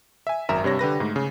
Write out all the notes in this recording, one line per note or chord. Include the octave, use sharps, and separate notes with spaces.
E5 G#5
G#1 F#2 A#4 E5 A#5 E7
G2 C3 C#5 A#6
D3 G4 B4 A#6
G#2 A3
C#3